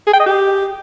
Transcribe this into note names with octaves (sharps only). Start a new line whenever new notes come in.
G#4
G5
D#5
G4